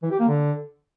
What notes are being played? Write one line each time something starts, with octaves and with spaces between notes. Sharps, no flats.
E3
G4
A#3
D3